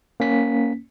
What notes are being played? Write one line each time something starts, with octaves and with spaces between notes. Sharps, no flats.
A#3 C#4 B6